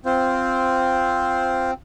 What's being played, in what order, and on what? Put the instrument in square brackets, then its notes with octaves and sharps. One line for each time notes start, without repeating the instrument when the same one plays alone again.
[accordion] C4 [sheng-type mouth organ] F4 C5